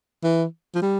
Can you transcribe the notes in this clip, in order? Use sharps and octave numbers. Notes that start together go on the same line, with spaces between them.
E3
F3
G3